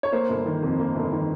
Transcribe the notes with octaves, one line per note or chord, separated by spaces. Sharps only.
C#5
A#3 C5
G1
D#3
F2
A#3
G1
D#3